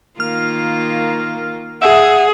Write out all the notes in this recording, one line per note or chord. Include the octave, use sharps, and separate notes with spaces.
D#3 A#3 F4 F6
G#4 E5 F#5